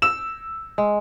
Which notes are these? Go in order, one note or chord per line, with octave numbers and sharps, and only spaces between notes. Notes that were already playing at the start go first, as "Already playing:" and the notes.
E6 E7
G#3